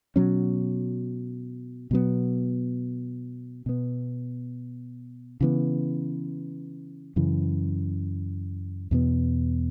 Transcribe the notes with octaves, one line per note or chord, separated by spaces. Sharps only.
B2 F#3 C#4
B2 F#3 B3
B2 B3
C#3 E3 B3
F#2 C#3 E3
E2 B2 B3